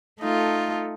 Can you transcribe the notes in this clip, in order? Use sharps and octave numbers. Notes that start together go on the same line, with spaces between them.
A3 D#4 F4 A4